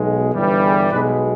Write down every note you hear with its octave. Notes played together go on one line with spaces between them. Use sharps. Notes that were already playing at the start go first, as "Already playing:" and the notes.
Already playing: B1 B2 G#3
G1 G2 E3 G3
G#4
B1 B2 G#3 B4